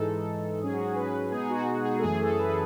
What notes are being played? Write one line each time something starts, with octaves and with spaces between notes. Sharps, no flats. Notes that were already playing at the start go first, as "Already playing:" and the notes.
Already playing: G#2 E3 G#3 D#4 A4
G#2 F#3 C#4 G#4
F#4
G#4
B4
B2 G#3 B3 D#4 G#4
F#4
G#4
G#4
A4
F#2 E3 A3 G#4
A4
B4